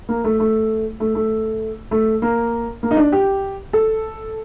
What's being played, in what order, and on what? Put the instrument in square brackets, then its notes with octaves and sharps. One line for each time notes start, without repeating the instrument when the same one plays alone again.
[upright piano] A#3
A3
A3
A3
A3
A3
A#3
A#3
D#4
D4
G4
A4